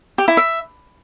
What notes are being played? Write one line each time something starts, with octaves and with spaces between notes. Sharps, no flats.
G4
E4
E5